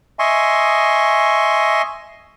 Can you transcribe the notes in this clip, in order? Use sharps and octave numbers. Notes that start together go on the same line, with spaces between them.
D#5 E5 G#5 C6 C#6